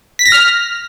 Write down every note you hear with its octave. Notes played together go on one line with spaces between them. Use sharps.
B6
A#6
F6